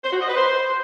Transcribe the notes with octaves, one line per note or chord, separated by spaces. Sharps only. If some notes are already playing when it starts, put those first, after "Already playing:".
C5
F#4
D#5
B4
C5